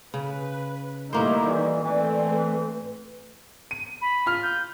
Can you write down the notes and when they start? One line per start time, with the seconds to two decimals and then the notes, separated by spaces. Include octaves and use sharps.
0.14 C#3 B4
1.13 A2 D#3 G3 A#3 E4 C5 D6
1.46 E3 D5
1.83 E3 A3 C4
2.27 B4
3.71 D#7
4.01 B5
4.26 F4 F6
4.43 G6